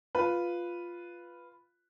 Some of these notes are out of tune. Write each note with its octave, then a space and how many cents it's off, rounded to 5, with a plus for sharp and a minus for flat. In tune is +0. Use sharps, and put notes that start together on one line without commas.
F4 +0 B4 +0